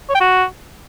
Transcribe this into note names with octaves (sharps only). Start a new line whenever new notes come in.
C#5
G5
F#4